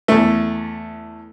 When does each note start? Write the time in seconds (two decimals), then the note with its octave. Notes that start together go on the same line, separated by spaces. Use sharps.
0.08 E2 A3